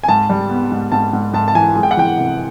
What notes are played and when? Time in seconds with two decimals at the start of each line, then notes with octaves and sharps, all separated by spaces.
0.04 G#5
0.09 G#2 A5
0.30 G3
0.50 B3
0.72 G#2
0.92 G#2 A5
1.13 G#2
1.33 G#2 A5
1.48 A5
1.55 E3 G#5
1.75 G#3 G#5
1.83 G5
1.91 F#5
1.97 E3 G5
2.17 C3